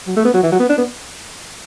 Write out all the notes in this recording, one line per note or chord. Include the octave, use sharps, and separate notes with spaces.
F#3
A3
B3
F#3
E3
F#3
B3
D4
B3